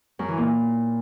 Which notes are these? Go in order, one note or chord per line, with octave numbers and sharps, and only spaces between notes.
F#2
E3
A#2